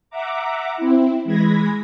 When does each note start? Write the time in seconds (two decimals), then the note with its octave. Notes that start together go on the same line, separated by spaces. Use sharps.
0.10 E5 F#5 A#5 D6
0.77 C4 E4
1.25 E3 G#3 B5 G#6 A#6